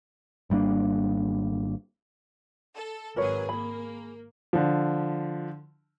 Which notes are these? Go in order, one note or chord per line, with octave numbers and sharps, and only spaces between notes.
G#1 G3 A#3 D4
A4
G#1 F#3 G#4 A#4 B4 C#5
A#3 G#4 B5
D3 F3